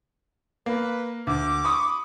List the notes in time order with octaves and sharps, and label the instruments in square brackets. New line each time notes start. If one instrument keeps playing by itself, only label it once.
[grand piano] A#3 [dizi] B4
[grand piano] D2 [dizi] D6
[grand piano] B5 C#6 D#6